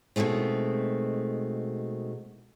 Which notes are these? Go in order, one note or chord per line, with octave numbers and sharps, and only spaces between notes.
B2 D#3 G#3 A3 C4